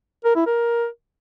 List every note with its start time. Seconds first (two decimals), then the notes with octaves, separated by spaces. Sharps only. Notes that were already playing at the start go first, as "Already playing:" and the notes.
0.24 A#4
0.35 E4
0.46 A#4